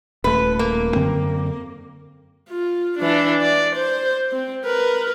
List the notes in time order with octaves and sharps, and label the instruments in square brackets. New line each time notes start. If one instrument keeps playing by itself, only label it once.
[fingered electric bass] D#1 A3 [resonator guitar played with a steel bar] B4
[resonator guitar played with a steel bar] A#3
[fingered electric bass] F#2 D3 C4
[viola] F4
E3 D4
D5
C5
C4
A#4 B4